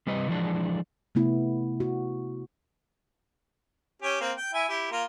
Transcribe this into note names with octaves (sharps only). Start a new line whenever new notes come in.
C3 G3 B4 D#5
E3 F3 G#3 D4
C3 A3 B3 E4
F#4
C#4 G4 G#5
A#3 C4
G5
E4 E5 G#5
E4 G4
A#3 F4 A#4